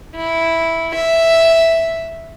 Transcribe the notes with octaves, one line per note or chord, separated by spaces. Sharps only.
E4
E5